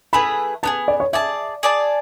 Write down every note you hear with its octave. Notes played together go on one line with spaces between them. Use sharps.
A3 E4 G#4 B4 B5
B3 D4 G#4 A5
D5
C#5
G#4 D5 E5 A5
G#4 D5 A5